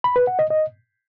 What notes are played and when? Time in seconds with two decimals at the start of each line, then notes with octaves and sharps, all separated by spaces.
0.04 B5
0.16 B4
0.27 F#5
0.39 D#5
0.50 D#5